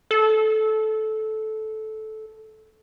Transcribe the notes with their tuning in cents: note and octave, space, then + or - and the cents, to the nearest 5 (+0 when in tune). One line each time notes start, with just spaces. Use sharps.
A4 -15